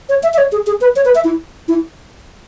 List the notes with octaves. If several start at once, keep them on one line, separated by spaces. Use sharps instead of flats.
C#5
E5
E5
C#5
G#4
G#4
B4
C#5
B4
E5
E4
E4